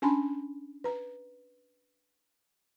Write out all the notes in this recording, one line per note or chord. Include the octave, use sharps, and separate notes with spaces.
C#4 D4 G#5 A5 B5 C6
B4 A#5